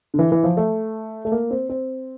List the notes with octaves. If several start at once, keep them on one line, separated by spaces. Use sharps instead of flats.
D3
E3
E3
F3
A3
A3
A#3
C4
C4